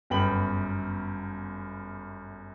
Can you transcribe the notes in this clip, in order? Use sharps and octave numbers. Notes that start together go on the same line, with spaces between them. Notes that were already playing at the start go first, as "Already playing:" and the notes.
G1 F#2 B3 G5 B5 F#7